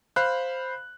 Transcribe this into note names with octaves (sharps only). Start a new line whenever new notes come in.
C5 F5 B5 F#6